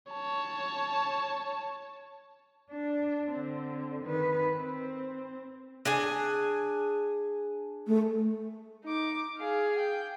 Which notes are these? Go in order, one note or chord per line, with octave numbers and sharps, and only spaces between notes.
C#5 A5
D4
D3 C4
D#3 B4
C4
D4 G#4 G#5
A3
D#4 D6
G#4 F5
G5